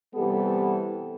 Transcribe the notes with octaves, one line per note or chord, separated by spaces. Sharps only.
C3 E3 G3 B3 G4 A4